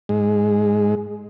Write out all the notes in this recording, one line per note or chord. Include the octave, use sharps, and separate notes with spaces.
G#2 G#3